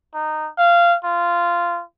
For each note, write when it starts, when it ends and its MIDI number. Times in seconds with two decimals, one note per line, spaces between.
0.14 0.49 63
0.58 0.96 77
1.04 1.82 65